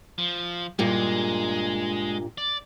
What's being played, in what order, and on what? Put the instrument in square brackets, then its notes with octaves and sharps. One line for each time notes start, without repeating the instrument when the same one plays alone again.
[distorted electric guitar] F3
[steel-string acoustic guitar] G2 A#2 [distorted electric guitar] G#3
[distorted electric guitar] D5